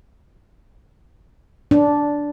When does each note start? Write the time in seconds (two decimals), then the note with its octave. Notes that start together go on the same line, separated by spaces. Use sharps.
1.71 D4